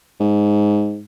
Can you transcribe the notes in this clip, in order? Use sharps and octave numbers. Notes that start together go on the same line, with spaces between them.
G#2